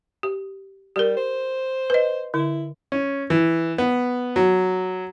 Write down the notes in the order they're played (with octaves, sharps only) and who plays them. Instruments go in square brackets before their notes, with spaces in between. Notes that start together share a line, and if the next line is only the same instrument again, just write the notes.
[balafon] G4
[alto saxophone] G3 [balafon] G4 A#4
[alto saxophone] C5
[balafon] B4 D#5
[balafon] D3 [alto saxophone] E4
[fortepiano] C#4
E3
B3
F#3